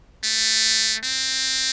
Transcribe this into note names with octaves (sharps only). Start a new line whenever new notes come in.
A3
C4